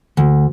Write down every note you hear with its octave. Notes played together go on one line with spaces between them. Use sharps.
D2